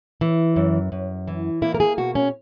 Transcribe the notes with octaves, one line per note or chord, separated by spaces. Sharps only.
E3
F#2
F#2
E3
A#3 E4
A#4
G#4
B2 F#4
C#4